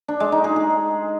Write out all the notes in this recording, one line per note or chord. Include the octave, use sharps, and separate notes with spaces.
D4
G#3
D#4
G#4
G#4